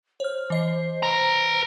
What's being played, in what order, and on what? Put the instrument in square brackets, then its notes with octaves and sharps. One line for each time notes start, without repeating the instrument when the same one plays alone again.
[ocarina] C5 [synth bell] C#5 F6
[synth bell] E3 D#5 C7
[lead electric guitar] B4 A#5